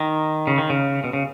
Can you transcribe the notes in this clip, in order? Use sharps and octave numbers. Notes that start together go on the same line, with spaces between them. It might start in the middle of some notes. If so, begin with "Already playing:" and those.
Already playing: D#3
C#3
D#3
C#3
B2
C#3